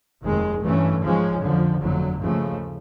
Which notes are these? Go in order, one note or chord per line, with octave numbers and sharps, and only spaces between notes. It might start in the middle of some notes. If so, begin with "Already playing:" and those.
F1 D#2 D#3 G#3
G2 E3 A3 C#4
G#2 F3 G#3 C#4
F2 D3 F3
G1 F2 D3 F#3 A3
D#2 C#3 F3 A3